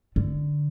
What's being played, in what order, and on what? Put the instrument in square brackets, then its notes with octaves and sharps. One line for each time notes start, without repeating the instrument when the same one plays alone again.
[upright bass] D3